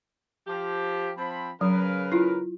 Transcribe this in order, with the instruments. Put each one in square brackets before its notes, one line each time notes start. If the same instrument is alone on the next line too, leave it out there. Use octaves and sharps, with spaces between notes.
[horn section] F3 G4
F3 C4 B5
[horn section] C#3 A#4 B4 [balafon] F#3
[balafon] E4 F4